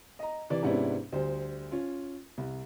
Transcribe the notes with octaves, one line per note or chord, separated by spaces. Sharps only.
D#5 A#5
C3 E3 D5
G#2 C3 B3 C#4 D4 E4
D2 G3 C5
C#4 F4
C2